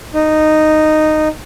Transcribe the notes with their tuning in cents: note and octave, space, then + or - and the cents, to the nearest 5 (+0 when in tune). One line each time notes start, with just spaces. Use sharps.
D#4 -10